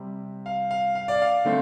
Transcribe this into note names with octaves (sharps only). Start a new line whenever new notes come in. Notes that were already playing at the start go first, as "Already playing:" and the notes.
Already playing: C3 G3 C4
F5
F5
F5
D5
F5
D3 A3 C4